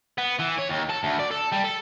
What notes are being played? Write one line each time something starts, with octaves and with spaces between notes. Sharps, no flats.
B3
E3
C#5
D#2
A4
D2
D5
A4
G3
A4